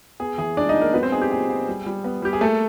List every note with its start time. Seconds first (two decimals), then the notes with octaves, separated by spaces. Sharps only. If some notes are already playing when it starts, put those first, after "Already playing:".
0.20 B3 G#4
0.38 E3 G#4
0.57 G#3 D4 D5
0.69 D#4 D#5
0.75 G#3
0.81 A#3 A#4
0.93 F#3 B3 B4
1.03 C4 C5
1.12 D#4 G#4
1.22 G4
1.31 A#2 G#4
1.49 B3
1.68 G3
1.86 G3
2.04 B3
2.22 G3 G4
2.33 G#4
2.41 A3 A#3 A4